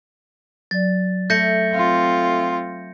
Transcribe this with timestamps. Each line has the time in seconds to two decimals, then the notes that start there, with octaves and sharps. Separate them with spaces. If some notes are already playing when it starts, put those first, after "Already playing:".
0.71 F#3 D5 A6
1.30 A3 G6 A#6 C#7
1.73 C4 F4